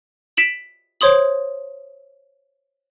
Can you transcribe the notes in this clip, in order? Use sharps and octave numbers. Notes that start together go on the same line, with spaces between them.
B6 D7 E7 F#7
C5 C#5 C6 D#6 F#7